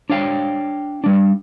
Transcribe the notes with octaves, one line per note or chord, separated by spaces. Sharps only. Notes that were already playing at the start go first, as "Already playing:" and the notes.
D4 C#5 F5 G5
G3 D4